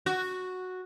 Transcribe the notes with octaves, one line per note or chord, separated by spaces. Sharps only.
F#4